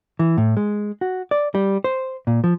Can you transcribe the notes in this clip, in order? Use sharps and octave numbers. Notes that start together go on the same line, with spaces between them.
E3
A2
G#3
F#4
D5
G3
C5
A#2
F3